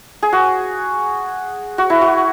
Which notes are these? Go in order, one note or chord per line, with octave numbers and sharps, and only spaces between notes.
G#4
F#4
F#4
E4
F#4